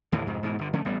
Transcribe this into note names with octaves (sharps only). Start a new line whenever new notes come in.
D#2 A2 D3 E3
F2 G#2 C3
G#2 B2 E3
G1 D3
D3 F3 A3 C#4
A1 G3 B3